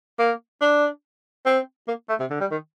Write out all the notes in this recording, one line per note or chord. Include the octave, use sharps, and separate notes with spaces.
A#3
D4
C4
A#3
A3
C3
D3
G3
D#3